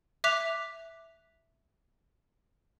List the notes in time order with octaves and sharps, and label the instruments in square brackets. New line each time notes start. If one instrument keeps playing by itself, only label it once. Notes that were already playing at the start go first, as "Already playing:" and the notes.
[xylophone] E5 D6 F#6 B6 F7